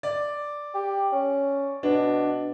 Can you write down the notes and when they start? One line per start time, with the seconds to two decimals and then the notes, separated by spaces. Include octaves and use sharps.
0.03 D5
0.75 G4
1.12 C#4
1.83 B2 D4